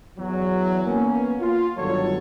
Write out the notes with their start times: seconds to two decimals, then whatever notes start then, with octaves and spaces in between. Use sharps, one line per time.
0.18 E2 F#3
0.85 A#3 B3 C#4
1.40 F4
1.77 G1 D#3 F#3 G3 A4 C#5